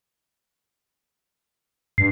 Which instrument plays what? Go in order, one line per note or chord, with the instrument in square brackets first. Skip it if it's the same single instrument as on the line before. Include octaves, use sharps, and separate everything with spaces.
[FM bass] G2 [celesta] C7